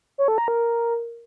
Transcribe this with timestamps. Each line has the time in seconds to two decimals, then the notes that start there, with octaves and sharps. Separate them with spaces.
0.18 C#5
0.28 A4
0.38 A#5
0.48 A#4